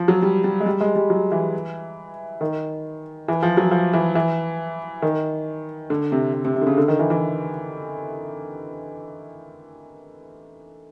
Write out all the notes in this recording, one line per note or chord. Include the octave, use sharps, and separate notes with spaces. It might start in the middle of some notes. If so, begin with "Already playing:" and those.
Already playing: F3
F#3
G3
G3
G#3
G3
G#3
G3
F#3
E3
D#3
E3
F3
F#3
F3
E3
E3
D#3
D3
C3
C3
C3
C3
D3
C#3
D3
D#3
E3
E3